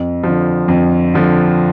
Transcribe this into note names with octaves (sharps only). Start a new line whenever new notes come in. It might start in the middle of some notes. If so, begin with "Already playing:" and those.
Already playing: F2
D3 F3
F2
D3 F3